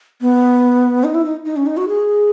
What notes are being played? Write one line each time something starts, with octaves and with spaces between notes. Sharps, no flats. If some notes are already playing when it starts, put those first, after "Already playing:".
B3
D#4
E4
D#4
D#4
C#4
D#4
F#4
G#4